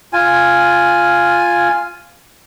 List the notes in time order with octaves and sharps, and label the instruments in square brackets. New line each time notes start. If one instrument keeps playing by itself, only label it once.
[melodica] F4 G#5